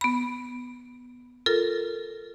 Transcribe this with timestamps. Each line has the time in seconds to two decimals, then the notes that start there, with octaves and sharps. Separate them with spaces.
0.01 B3 B5
1.46 F4 A4 A#4